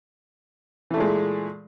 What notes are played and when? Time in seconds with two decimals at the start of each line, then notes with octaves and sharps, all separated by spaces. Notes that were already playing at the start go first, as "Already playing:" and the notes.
0.91 E3
0.94 A3
0.97 A#2
1.00 G#3